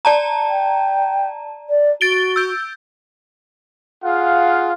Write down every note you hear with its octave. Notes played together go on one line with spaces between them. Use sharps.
D5 A5 A#5
G5
D5
F#4 A6 D7 G7
E6 G6
F4 G#4 F5 F#5